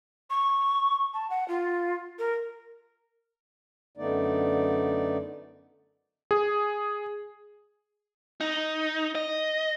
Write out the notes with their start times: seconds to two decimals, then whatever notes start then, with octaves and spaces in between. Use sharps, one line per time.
0.30 C#6
1.14 A5
1.30 F#5
1.48 F4
2.19 A#4
3.97 F#2 D3 A3 B3 D#4 D5
6.31 G#4
8.41 D#4
9.15 D#5